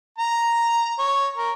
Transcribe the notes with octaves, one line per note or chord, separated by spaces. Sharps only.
A#5
C#5
A#4